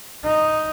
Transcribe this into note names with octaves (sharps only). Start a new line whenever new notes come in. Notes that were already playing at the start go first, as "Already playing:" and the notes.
D#4